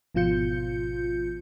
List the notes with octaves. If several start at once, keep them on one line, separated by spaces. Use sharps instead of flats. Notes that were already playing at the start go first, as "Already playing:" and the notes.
G#1 B2 F3 F4 G6 C#7